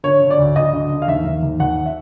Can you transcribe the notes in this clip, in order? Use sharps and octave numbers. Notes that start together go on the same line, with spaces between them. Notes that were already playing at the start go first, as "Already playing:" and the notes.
D3 C#5
D3
D5
D2
D2 D#5
D3
D3
F5
D#2 E5
D#2
D#2
D#2 F#5
E5